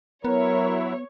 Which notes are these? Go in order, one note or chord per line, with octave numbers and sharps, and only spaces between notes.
F#3 B3 E4 A#4 C#5